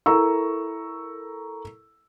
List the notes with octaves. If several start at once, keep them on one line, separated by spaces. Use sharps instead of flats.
E4 A4 A#4 A#5 C#6 E6